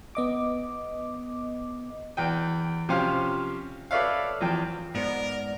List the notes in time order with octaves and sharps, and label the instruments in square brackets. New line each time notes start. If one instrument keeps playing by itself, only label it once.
[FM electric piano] B3 D#5 D6
[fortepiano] E2 G5
C3 F3 C#4 G4 C5 F5
A4 B4 C#5 D5 E5 F5
E2 F3 G5
[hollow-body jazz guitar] G#2 C5 [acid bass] B3 [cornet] A#4 [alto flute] D5